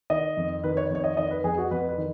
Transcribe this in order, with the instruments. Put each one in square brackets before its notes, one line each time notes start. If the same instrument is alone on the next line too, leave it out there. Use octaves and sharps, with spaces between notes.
[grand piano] D#3 D#5
F2
D#3 B4
C#5
F2 C#5
D#5
D#3 D#5
B4
F2 G#4
F#4
F2 B4
B4
D#3